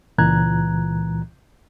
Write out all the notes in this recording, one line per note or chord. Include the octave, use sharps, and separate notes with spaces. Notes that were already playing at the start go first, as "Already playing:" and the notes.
C#2 A#2 E3 A#5 F#6 G#6